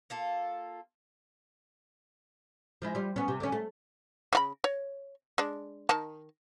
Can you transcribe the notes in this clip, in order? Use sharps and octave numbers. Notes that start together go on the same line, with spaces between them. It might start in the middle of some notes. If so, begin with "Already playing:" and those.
A#3 F4 A4
F3 G#3 E4
G3 F4
B3 C#4
C3
D3 C#4
A3
C#3 F4 B5
C#5
G#3 D4
D#3 A5